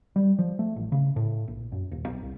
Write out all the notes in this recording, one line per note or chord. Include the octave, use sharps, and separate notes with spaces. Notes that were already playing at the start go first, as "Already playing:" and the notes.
G3
F3
A3
A1
C#3
A2
A#1
F#2
D#1
B1
C2